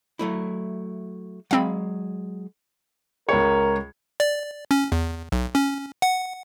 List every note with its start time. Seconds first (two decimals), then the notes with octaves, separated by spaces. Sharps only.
0.19 F#3 A3 E4
1.51 F#3 G#3 C4 F5 B5
3.29 C#2 A#4 C#5
4.20 D5
4.71 C#4
4.92 E2
5.32 B1
5.55 C#4
6.02 F#5